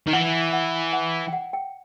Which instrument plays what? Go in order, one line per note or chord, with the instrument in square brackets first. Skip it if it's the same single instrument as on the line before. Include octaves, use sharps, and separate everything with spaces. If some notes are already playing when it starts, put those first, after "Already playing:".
[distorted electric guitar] D#3
[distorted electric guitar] E3 [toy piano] F#5
[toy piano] F#5
F#5
G5
F#5
G5